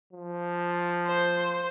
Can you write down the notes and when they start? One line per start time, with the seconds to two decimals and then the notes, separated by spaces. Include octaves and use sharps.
0.13 F3
1.07 C5